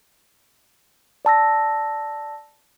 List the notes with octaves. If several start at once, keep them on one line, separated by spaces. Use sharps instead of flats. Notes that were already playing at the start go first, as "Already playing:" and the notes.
D5 A5 E6 A#6